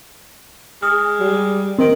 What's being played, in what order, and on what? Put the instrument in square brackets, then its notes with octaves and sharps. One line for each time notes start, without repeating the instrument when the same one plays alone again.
[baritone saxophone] G#3 [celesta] D#6 F6
[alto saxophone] G3
[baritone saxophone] D#3 [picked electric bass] C4 [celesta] A#4 D#5 D7